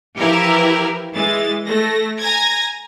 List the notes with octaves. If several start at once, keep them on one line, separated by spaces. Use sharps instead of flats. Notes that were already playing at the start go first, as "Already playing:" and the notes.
E3 F3 E4 G4 A#4 B4
E3 G#3 A6
A3 A#6
G#5 A#5 G#6 A#6